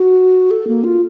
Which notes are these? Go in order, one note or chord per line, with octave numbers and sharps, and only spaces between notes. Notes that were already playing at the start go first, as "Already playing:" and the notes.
Already playing: F#4
A4
A#3
F4